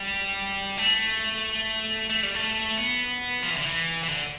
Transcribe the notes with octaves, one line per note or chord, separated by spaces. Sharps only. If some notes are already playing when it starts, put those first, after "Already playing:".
Already playing: G3
A3
A3
G3
A3
B3
F3
E3
D3
E3
E3
D3